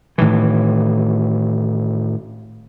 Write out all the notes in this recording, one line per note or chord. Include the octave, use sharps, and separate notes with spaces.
A2 D#3 E3